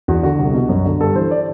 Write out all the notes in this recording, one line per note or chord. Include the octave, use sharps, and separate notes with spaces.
E2 F#4
D3 F#4
C2
B2
F#2
D3
G2 A4
E3 C5
D5